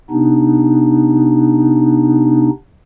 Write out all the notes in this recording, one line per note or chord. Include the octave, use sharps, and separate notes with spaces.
C3 B3 D4 D#4